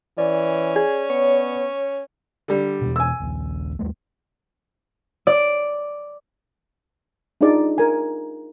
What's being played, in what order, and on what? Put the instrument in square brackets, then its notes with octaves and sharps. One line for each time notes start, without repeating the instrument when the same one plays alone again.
[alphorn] E3 [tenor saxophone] C#4 [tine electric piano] D5
[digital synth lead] G#4
[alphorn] B3 [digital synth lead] C#5
[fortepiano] D3 G3
[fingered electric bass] E2 B2
[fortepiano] G#5 E6
[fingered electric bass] D#1 A#1 D#2
D#2 G3 A3
[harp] D5
[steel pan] D4 D#4 F4 G#4 D5
A#4 G#5